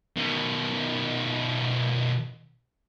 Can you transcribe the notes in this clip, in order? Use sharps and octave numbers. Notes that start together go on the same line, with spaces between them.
B2 D#3